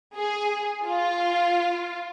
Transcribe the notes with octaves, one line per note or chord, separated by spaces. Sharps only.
G#4
F4